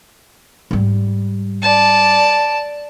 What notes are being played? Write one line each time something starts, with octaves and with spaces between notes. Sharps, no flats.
G#2 G3
D5 A5